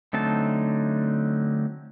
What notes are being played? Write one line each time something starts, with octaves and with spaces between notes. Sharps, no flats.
D3 F#3 A3 C4 D#4 A5